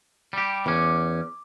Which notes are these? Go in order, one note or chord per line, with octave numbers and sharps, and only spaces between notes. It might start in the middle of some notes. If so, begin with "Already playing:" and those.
G3 G4
E2 C#4 D6